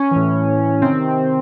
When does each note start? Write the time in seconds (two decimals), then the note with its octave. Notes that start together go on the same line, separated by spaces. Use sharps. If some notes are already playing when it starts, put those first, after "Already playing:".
Already playing: C#4
0.11 A2 E3
0.82 C3 D#3 C4